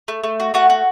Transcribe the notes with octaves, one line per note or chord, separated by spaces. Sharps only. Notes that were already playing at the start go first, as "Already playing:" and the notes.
A3
A3
F#4
A3 F#4 F#5
F#4